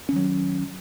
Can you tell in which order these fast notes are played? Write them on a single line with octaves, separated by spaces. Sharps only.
C#4 D#3 F#3